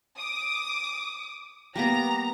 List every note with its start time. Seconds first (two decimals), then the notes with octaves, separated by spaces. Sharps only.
0.18 D6 D#6
1.76 G3 A#3 B3 A#5